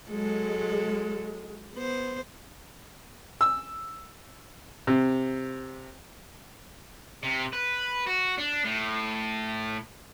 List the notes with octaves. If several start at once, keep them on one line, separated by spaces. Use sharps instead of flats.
F#3 G#3 A4
B3 C5
E6
C3
C3
B4
F#4
D4
A2